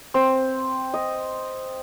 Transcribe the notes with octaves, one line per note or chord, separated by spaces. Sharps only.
C4
D#5